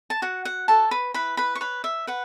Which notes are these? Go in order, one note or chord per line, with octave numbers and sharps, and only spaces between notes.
A5
F#4 F#5
F#5
A4 C#5 A5
B4 B5
E4 B4 B5
B4 B5
C#6
B4 C#5 B5
E5
B4 F#5